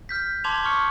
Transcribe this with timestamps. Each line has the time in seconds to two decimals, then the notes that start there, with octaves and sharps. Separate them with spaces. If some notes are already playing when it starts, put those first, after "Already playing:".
0.09 F6 G6 B6
0.44 A5 C6 D6 G#6 F7
0.64 C6 C#6 F6 C#7